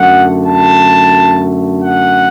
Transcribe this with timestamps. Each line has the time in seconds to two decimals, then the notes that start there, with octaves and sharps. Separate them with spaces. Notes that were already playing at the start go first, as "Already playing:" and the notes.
Already playing: F#2 D3 A3 F#5
0.47 A5
1.85 F#5